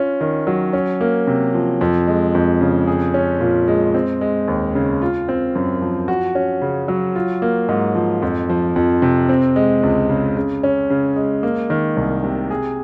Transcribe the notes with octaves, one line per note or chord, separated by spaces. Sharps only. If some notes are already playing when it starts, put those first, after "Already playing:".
Already playing: C#4 F4
D#3
F#3
C#4
A#3
C3
F3
F2
G#3
F2
C#3
G#4
C#4
A#2
G#3
C4
G#3
D#2
C#3
F4
C4
F#2
F3
F#4
C#4
C#3
F#3
F4
A#3
G#2
F3
F2
F3
F2
C3
C4
G#3
C#2
C#3
C#3
C#4
C#3
G#3
A#3
D#3
C2
C3
G#4